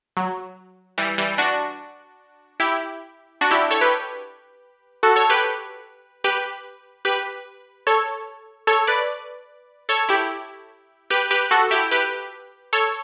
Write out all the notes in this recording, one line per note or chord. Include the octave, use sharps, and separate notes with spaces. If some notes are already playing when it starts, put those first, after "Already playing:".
F#3
E3 G3
E3 G3
D4 F#4
E4 G4
D4 F#4
E4 G4
A4 C#5
G4 B4
F#4 A4
A4 C#5
G4 B4
G4 B4
G4 B4
A4 C#5
A4 C#5
B4 D5
A4 C#5
E4 G4
G4 B4
G4 B4
F#4 A4
E4 G4
G4 B4
A4 C#5